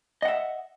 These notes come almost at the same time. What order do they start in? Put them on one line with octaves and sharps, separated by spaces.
D#5 F#5 E5